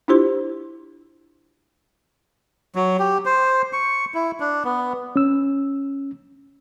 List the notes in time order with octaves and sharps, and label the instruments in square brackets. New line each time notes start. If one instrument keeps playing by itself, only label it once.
[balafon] D4 E4 F4 G4 C5 C6
[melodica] F#3
G4
C5
C#6
E4
D4
B3
[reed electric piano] C#4 E6